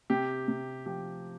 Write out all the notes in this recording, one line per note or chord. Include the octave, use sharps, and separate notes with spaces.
C3 G4
C3
F3 G4